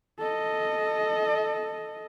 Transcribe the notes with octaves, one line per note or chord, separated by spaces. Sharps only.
A4 D#5